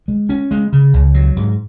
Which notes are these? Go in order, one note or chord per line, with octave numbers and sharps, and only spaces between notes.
G#3
C#4
G#3
C#3
C#2
F#3
G#2